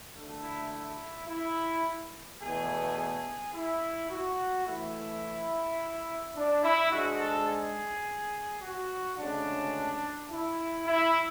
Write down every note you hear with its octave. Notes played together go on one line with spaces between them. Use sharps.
D2 D3 A3
E4
E4
E4
E2 B2 A3 G#4
G#4
E4
F#4
A2 E3 A3 E4
D4
E4
G#2 G#3 D4 F#4
A4
G#4
F#4
D2 C#3 G#3 C#4 D4
E4
E4